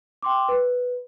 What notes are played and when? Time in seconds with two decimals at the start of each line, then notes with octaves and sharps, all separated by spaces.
0.22 G5 C6 D6
0.48 B4